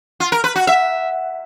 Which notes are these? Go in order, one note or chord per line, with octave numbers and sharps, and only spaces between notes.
F4
A#4
B4
F#4
E5